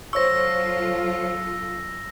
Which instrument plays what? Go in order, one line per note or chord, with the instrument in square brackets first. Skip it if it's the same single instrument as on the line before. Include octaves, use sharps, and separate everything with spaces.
[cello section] F#3 F4 A4 [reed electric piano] C5 C#5 C#6 [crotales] E6 A#6